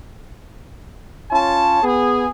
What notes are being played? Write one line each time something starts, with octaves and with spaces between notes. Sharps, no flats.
C#4 F4 C#5 A5
B3 G#4